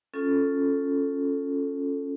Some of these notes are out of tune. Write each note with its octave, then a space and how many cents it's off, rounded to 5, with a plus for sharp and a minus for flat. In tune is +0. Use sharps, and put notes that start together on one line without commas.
C#4 +0 F4 +0 A4 +0